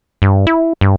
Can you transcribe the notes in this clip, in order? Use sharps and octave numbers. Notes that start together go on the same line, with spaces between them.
G2
E4
G2